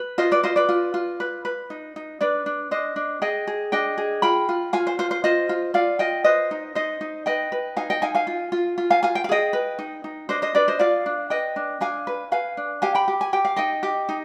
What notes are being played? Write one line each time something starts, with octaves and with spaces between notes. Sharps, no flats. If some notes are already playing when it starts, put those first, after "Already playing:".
Already playing: B4
F4 C5 D#5
B4 D5
F4 C5 D#5
B4 D5
F4
F4
B4
B4
D#4
D#4
D4 B4 D5
D4
D4 C5 D#5
D4
G#4 D#5 G5
G#4
D4 D#5 G5
G#4
F4 G5 B5
F4
F4 F5 G#5
C5
F4 C5
C5
F4 C5 D#5
F4
F4 D5 F5
F4 D#5 G5
B4 C5 D#5
D#4
D#4 C5 D#5
D#4
B4 D#5 G5
B4
D#4 F5 G#5
D#5 G5
D#4 F5 G#5
F5 G#5
F4
F4
F4
F5 G#5
F4 F5 G#5
G5
F5
G#4 D#5 G5
B4
D#4
D#4
D4 C5 D#5
C5 D#5
D4 B4 D5
C5 D#5
F4 D5 F5
D4
B4 D#5 G5
D4
D4 F5 G#5
B4
B4 F5 G#5
D4
G4 F5 G#5
G5 B5
G4
G#5
G4 G5
F5
D#4 D#5 G5
G4
D#4